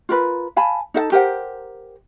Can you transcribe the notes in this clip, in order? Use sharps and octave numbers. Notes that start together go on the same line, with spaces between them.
F4 A#4 B4
F5 G#5 A5 B5
D#4 A4 F5 A5
G4 A#4 C5 F#5